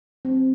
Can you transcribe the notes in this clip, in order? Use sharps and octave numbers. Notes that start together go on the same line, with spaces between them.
C4